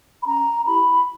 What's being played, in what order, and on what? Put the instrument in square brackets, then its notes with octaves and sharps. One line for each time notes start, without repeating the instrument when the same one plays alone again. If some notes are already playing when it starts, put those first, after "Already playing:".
[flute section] B5
C#4 A#5
E4 G4 B5